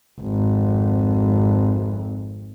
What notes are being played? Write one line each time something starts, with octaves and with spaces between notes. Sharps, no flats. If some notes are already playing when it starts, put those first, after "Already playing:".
G#1 F2